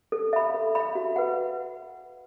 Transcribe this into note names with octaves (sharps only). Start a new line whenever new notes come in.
A4
E5 B5
A4
E5 B5
F#4
B4 F#5